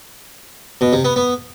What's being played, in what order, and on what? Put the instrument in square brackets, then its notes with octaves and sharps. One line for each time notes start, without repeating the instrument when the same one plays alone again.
[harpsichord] B2
C3
B3
B3